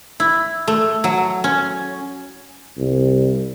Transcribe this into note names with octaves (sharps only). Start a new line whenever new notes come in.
E4
A3
F#3
C#4
C2